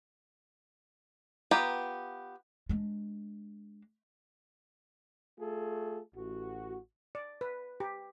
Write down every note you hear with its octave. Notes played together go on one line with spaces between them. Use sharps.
B3 F4 G4 A#5
G#3 D4
A3 F4 G#4 A4
A1 F#4
D5
B4
G4